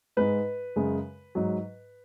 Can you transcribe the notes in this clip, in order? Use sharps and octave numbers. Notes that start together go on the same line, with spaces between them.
G#2 G#3 B4
F#2 C#3 G#3
G#2 F#3